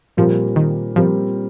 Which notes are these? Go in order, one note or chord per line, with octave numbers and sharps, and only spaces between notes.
A#2 F3 G3 C4 G4 A#4
D#3
A#2 F3 G3 C4 G4 A#4